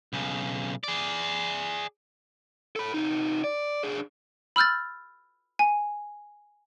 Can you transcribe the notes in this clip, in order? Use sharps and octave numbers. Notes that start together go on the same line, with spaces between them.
B1 C#3
G#4 D5
A4 B5
C3 D#4
D5
D4 G#4
B5 E6 F6 G6 A6
G#5